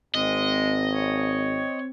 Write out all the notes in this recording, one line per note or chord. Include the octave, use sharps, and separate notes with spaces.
G#1 G#3 C4 D#5
C#5